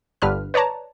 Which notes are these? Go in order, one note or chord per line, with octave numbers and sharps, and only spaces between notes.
G1 G2 D3 B4 F6
B4 C#5 D5 A5 A#5